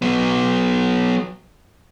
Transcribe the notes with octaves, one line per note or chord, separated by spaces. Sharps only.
F#3 B3